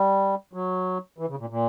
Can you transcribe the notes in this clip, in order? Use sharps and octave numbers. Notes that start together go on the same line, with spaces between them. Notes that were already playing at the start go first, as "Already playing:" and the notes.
Already playing: G3
F#3
E3
C#3
A#2
A#2